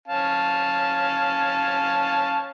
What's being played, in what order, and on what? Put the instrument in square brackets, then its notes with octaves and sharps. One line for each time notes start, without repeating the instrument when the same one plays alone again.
[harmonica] C#4 F5 A5